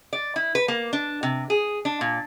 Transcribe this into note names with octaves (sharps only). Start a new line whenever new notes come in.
D5
E4
B4
A#3
D4
C3
G#4
D4
A#2